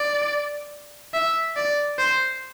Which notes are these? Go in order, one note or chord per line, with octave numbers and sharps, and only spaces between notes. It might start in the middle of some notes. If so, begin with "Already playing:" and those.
Already playing: D5
E5
D5
C5